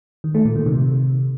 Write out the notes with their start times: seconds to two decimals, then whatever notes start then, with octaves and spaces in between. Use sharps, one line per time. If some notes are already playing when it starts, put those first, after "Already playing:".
0.24 D#3
0.35 A3
0.45 A#2
0.56 D#3
0.66 C3